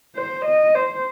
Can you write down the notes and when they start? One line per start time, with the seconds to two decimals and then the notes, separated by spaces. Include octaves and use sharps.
0.16 C5
0.45 D#5
0.75 C5